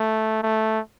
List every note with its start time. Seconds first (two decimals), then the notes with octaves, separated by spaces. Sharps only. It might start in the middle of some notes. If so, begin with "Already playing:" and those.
Already playing: A3
0.43 A3